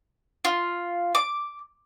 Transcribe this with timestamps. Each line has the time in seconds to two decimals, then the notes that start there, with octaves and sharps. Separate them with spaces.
0.45 F4
1.15 D6